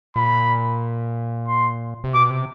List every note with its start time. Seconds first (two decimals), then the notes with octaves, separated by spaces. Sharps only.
0.16 A#2 B5
1.48 C6
2.04 C3
2.14 B2 D6
2.30 C3